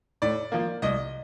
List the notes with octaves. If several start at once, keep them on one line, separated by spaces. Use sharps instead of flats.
A2 D5
F3 A#3
C2 D#5